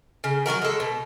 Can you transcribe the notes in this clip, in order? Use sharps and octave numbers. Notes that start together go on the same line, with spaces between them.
C#3
F#3 A#3 F#4 A#4
G#3 A4
B2